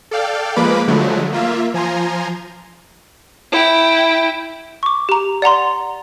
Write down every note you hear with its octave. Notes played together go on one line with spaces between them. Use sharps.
A4 D5 F5 G5
F3 G#3 A#3 B4 B5 D6
D3 F3 F#3 G#3 A3
A#3 F4 E5
F3 G#5 A#5 C6
E4 G5
C#6 D6
G4 A#5
D5 F#5 A#5 C6